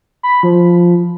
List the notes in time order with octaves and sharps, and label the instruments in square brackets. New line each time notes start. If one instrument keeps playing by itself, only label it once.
[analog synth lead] B5
F3